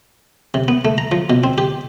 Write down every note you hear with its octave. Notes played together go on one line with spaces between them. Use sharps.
C3
B3
A3
A#5
F3
B2
C4
G4